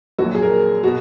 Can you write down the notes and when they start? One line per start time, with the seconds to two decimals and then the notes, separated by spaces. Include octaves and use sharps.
0.19 A#1 A#2 F#3 F#4
0.35 G#4
0.42 A#4
0.84 B2 F#4